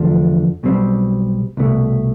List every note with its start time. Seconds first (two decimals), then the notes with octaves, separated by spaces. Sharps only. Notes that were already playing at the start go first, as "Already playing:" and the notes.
Already playing: E2 D3 F3 A3 D4
0.63 B1 B2 G3 C4
1.57 C2 B2 A3